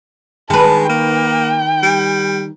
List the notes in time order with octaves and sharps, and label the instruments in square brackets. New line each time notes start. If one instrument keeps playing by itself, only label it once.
[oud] D#3 B4 [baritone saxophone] G#3 [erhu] A5
[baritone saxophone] A#3 [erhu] G5
[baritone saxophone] G3